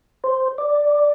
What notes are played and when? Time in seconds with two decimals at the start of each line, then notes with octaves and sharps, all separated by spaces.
0.24 C5
0.58 D5